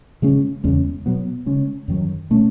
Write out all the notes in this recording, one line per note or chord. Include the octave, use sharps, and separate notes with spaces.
C#3 G#3 C#4
E2 C#3 G#3 C#4
B2 F#3 B3
C#3 G#3 C#4
F#2 D#3 F#3
B2 A3 C#4